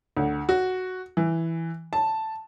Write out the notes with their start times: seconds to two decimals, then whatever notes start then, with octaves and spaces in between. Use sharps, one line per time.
0.17 D2
0.49 F#4
1.17 E3
1.93 A5